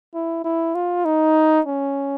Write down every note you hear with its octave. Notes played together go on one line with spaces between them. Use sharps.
E4
E4
F4
D#4
C#4